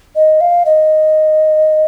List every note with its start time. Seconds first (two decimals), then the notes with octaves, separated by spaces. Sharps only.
0.16 D#5
0.41 F5
0.66 D#5